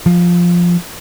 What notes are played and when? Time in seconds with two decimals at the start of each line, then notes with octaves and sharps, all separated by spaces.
0.06 F3